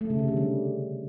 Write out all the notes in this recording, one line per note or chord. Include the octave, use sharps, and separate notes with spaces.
A3
C#3
C3
D3
G3